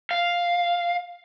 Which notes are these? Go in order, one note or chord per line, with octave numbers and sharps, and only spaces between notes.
F5